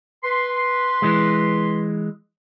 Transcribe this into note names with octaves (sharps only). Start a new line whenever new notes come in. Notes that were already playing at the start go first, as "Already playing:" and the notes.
B4 C6
E3 G#3